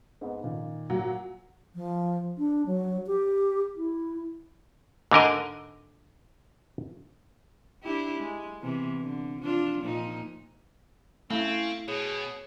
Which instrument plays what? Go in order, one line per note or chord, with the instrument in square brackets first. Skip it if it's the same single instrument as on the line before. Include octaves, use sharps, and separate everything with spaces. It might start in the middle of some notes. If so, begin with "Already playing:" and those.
[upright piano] G#2 B3
A#2 D#3
[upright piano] A#2 [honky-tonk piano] F#3
[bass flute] F3
D4
F#3
G4
E4
[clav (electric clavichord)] G#2 D3 A#4 D#5
[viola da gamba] D4 E4 G4
G#3
C3 E3 B3
D3
F3 D4 F4
A#2 F3 D#4
[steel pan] A3 [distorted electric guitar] C4 [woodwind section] C#4 [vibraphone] E4 F5
[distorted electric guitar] B2 [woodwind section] G#4 [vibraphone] C#5